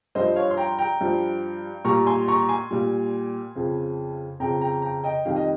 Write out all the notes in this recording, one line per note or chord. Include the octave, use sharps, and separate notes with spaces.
G2 F3 C5 D#5
C#5 F5
C6
G5 A#5
G5 A#5
G2 F3
A#2 G3 A#5 C#6
G#5 C6
A#5 C#6
G#5 C6
A#2 G3
F2 C#3 F3
F2 C#3 F3 G5 A#5
G5 A#5
G5 A#5
D#5 G5
F2 D#3 G3 F5
D#5